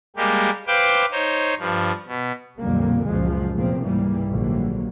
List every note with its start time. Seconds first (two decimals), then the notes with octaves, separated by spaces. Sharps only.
0.16 G3 G#3 A#3 G4
0.67 B4 C5 F5 G5 D6
1.11 D#4 C5 C#5
1.59 G2 F3
2.07 B2
2.60 B1 F2 A#2 D3 G3 A#3
3.09 C#2 F#2 A#2 F3 G#3
3.55 F1 E2 A#2 F3 A#3 C4
3.84 C#2 G#2 E3 G3 A#3
4.30 A#1 D3 F#3 G3 A#3